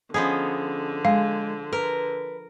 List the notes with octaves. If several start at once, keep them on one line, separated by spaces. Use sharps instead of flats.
D3 F3 B3 C#4 G#4 D#5
G#3 F5
A#4 B4